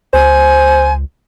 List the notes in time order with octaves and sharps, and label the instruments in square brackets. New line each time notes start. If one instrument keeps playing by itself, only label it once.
[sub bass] C#2 [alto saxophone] C5 [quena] G#5